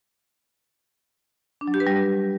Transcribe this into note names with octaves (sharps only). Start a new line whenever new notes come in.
D4
F#3
G4
B4
G3